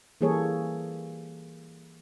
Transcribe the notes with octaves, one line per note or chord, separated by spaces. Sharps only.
E3 G3 A#3 G#4 A4 C#5